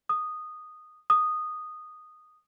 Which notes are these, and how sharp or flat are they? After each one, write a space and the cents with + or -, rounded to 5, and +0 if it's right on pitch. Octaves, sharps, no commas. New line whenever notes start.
D#6 -10
D#6 -10